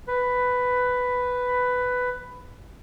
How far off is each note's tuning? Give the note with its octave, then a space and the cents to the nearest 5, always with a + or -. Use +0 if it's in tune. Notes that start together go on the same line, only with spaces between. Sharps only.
B4 +10